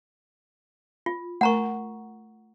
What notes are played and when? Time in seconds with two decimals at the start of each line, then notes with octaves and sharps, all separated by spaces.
1.06 F4
1.41 A3 A#4 F#5 A#5 C#6